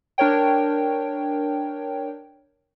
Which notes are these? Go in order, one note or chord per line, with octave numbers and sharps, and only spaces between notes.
D4 A#4 C#5 G5